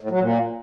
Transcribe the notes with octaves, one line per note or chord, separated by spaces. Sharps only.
A2
F#3
A#2